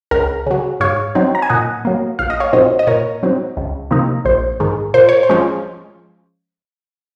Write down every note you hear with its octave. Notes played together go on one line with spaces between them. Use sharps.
C#2 A#4
C#3 F#3
G#2 C#5 F5
F#3 C4 D#4
A#5
G#5
A#2 D#5 F#5
F#3 A#3
A#1 F5
D#5
C#5 F5
A#2 F#3 C4 D#4 C5 D#5
D#5
A#2 A#4 C#5
F#3 C4 D#4
C#2
C3 F3 A#3 D#4
A#1 C5
G#2 D#3 G#3
A#2 C5
C#5
C5
F3 G#3 C#4